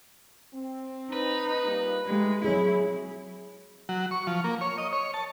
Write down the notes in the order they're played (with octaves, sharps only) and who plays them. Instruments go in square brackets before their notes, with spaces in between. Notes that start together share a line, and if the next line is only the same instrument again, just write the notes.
[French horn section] C4
[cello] D#4 [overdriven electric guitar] B4
[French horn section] G3 A#3 F4
[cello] G#3 [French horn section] A3 D#4 G4
[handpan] F#3 C4 G#4 [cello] E4 [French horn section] C#5
[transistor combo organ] F#3
C#6
F3
A#3
C#5
D#5
C#5
A5